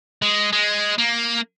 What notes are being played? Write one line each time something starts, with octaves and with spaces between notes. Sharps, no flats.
G#3
G#3
A#3